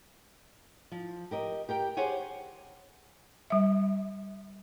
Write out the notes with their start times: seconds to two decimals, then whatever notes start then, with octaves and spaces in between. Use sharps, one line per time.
0.92 F3
1.31 G4 A#4 D#5
1.69 G4 A#4 G5
1.97 G4 G#4 C5 C#5 F#5 G#5
3.50 G3 E5